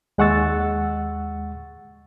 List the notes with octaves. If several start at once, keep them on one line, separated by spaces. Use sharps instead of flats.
D#2 G#3 F#5 C#6 E6 A6